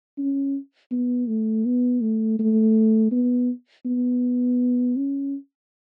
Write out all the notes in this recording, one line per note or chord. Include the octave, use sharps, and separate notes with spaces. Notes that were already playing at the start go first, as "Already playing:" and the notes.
C#4
B3
A3
B3
A3
A3
B3
B3
C#4